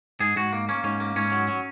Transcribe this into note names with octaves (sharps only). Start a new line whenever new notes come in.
G#2 G#4
G#2 F#4
A#3
A#3 C#4
G#2 C#4
A#3
G#2 C#4
F#3
F#3